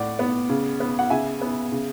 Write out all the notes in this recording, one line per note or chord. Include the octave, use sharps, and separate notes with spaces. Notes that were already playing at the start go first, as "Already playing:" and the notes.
Already playing: A2 D5 F#5
B3
C#3
B3
F#5
C#3 E5 G#5
B3
C#3